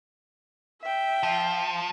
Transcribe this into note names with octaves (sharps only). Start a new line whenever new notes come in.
E5 G5
F3